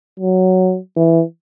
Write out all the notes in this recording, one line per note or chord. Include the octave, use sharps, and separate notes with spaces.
F#3
E3